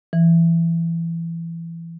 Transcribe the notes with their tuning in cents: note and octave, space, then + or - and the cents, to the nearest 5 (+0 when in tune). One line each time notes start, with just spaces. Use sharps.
E3 +20